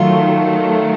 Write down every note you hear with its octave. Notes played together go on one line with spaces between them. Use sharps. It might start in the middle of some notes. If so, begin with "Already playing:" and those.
Already playing: D#3 F#3 A3 F4